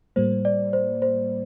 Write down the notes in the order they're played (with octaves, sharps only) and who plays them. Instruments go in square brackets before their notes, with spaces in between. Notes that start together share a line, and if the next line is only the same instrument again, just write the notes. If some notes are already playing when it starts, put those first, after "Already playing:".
[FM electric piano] A2 G3 A#3 [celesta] C5
[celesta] D5
C5
C5